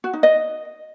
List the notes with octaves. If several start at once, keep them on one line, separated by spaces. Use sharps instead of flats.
F#4
D#4
D#5